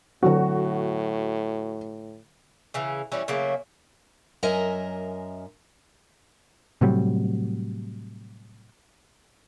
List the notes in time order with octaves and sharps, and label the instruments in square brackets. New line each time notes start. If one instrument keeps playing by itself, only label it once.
[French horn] A2 [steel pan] D3 F#3 C4 [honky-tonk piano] F#4
[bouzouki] C#3 E3
E3 G3 C#4
C#3 F#3 A3 A#3
[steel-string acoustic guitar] F#2 A#4 D#5 E5 G#5
[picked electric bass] A2 C3 F#3 G3